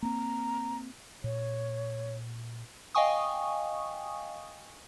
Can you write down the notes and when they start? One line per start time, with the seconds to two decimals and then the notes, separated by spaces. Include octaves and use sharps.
0.02 A#3 C4 A#5
1.24 A#2 C#5
2.95 D#5 F5 G5 G#5 C#6 D#6